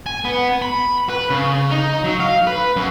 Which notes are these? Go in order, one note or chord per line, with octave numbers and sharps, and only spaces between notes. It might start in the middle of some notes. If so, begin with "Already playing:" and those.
G#5
B3
B5
B4
C#3
D#4
F#3
F5
B4
F#2